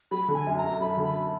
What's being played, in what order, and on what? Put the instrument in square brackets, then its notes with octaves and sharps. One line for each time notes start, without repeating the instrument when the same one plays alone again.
[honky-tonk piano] F#3 [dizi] B5
[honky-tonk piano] D3
[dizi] G#5
[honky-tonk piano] F#2
[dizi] A#5
[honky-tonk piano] F#2
[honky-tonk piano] F#2 [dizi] B5
[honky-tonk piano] D3
[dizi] B5